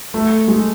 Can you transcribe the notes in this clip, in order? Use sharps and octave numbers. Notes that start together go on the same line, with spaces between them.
A3
G#3